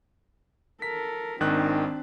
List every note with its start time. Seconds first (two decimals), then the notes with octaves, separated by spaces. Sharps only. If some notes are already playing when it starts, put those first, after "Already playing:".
0.82 A4 A#4 B6
1.40 G#1 D#3 C4 D4 F#6